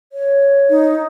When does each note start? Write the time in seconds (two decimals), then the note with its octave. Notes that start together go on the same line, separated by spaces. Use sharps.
0.12 C#5
0.70 D#4